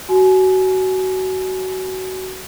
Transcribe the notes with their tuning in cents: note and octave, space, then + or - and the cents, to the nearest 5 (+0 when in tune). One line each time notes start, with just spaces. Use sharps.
F#4 +20 G#5 +30